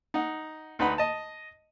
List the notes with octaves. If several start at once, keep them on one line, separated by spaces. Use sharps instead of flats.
D#4 F#5
D2 D#4 B4 F#5 B5
D#5 A5